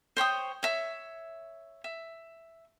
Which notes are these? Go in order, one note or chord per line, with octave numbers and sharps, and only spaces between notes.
C5 C#5 G5 D#6
C#5 E5
E5